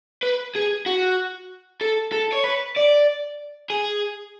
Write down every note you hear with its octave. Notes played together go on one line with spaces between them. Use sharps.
B4
G#4
F#4
A4
A4
C#5
B4
D5
G#4